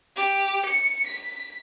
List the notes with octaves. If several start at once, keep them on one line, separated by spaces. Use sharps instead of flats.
G4
C#7
B6